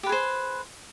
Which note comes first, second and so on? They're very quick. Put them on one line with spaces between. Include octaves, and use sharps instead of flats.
G4 B4 G#4 C5